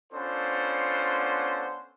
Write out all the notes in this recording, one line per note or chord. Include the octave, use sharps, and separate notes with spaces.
B3 C#4 D4 F4 A4 C5